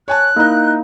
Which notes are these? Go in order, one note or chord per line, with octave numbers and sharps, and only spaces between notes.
C#5 G#5 A5 F#6
A#3 D#4 E4 A#4 D#5